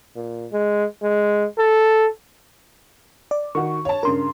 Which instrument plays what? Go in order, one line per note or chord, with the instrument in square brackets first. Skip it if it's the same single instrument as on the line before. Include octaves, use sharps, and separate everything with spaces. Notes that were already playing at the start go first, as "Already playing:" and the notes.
[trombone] A#2
G#3
G#3
A4
[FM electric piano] D5
[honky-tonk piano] D#3 F#4 [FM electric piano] C#6
[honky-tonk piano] C#5 A5
[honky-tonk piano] G2 C#3 [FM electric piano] A#4 C6